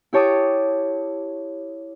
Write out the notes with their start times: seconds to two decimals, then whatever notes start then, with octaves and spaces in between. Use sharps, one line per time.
0.13 E4 G4 C#5 A5 D6 D#6